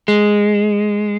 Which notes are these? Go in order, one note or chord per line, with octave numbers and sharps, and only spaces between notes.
G#3